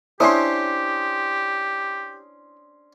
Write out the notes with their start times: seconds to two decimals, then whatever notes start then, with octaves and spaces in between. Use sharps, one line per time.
0.20 C#4 D4 E4 G4 C5 C6 D6 D#6